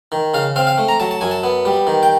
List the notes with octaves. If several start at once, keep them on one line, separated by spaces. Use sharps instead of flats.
D#3
C#3 F5
C4 F5
F5
A3
A#5
F#3 A5
A5
F#2 G#5
A5
B3
G3
D#3
G5